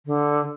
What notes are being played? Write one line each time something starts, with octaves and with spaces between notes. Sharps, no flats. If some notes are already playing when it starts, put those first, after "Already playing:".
D3